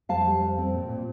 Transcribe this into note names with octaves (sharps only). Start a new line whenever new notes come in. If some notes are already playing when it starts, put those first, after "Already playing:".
F2 F5 A5
G3
F2
C4
A#2
A#2